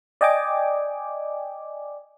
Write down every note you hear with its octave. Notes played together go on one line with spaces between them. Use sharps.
D5 D#5 G5 G#5 D6